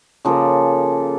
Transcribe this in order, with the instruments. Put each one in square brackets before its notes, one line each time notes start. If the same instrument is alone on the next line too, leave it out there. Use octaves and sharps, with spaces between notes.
[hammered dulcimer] C#3 F3 A#3 A4